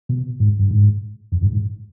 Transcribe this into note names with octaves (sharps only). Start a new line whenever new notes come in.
B2
G#2
G2
G#2
F2
G2
G#2